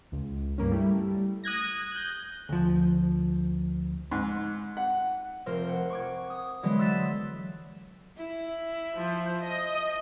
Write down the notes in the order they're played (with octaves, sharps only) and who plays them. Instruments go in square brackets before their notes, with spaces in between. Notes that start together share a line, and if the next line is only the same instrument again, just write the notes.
[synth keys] C#2
G2 A#3 C#4
G3 A3 E4
D#6 F#6 G#6 A#6
F#6 G6
[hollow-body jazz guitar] D2 F3
[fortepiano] G#2
F#5
[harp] F1 A#4 C5
F#5
C#6 D6 G#6
D#6
D3 E3 F#3 G#3 B3
C6 E6 F#6 A6 B6 E7
[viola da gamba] E4
[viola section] F3 C5
D#5